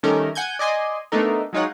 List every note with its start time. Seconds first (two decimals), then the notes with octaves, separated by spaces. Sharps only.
0.03 D#3 G3 A3 C#4 A4 A#4
0.35 F#5 G#5 G6 G#6
0.59 D5 D#5 G#5 C6
1.12 A3 B3 D4 D#4 A4 A#4
1.53 F#3 G#3 D#4 F4 C#5 F#5